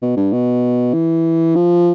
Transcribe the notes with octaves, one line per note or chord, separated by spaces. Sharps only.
B2
G2
B2
E3
F3